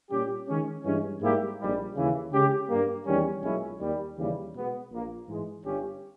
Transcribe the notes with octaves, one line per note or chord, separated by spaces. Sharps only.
A#2 G3 C#4 G4
D#3 G#3 C#4
G2 E3 G#3 C#4
G#2 G3 A#3 E4 G4
A#1 G#2 G3
D#2 C#3 E3
C#3 G#3 C#4 G4
G2 G3 A#3
E2 D#3 G3 C#4
B1 A#2 G#3 C#4 E4
D#2 D#3 G3
D#2 C#3 E3 G3
B2 G#3 B3
A#1 A#2 A#3
G#2 E3 G#3
G1 G2 G3 C#4 G4